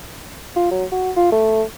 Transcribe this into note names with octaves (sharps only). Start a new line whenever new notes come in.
F4
F#3
F#4
F4
A3